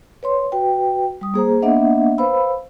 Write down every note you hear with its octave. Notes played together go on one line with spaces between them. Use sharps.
B4 C#5 C6
F#4 B4 G5
G3 D#6
A#3 G#4 C5 A#5
A#3 B3 D4 D#5 E5 F#5
B4 C5 F5 B5 E6